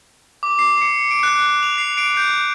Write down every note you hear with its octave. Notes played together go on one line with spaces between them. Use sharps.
D6
C7
C#7
D7
F#6
F7
C7
D7
G6